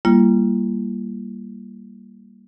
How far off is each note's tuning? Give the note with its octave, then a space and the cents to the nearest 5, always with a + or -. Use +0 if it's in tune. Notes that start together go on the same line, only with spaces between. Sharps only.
G3 +0 A#3 +0 F4 -45